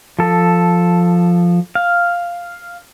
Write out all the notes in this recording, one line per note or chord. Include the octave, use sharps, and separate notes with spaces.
F3 A4
F5